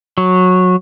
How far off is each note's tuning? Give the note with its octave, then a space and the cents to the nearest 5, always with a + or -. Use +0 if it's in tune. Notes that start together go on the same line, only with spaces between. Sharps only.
F#3 -15